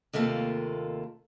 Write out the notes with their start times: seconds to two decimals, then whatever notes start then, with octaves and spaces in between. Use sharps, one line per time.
0.13 D#2 C3 A3 A#3 F4